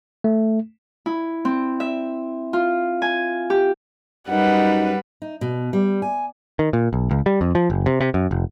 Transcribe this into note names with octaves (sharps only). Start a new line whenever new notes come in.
A3
E4
C4
E5
F4
G#5
G4
F#2 G3 D#4 B4 F#5
D#4
B2
G3
G#5
D#3
A#2
B1
C#2
G3
F2
F3
F#1
C3
C3
F#2
F1